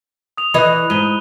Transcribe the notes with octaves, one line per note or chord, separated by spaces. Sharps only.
D#6 F7
E3 D#5 B5 F#6
G#2 D#7 G7